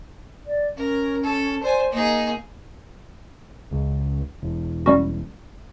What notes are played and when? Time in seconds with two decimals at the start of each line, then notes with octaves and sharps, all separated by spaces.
0.46 D5
0.77 C#4 A#4
1.23 A4
1.63 C5 D5 G#5
1.92 A#3 D#4 G#4
3.71 C#2
4.42 E1
4.86 G3 C#4 F#4